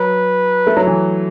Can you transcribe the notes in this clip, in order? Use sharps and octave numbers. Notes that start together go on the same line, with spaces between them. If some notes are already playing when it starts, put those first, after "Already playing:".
Already playing: F#3 B4
A3
F#3
E3